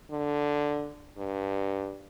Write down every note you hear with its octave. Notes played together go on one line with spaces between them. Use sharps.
D3
G2